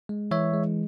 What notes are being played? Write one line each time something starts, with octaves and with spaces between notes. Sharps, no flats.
G#3
E3 C#5 E5
G#3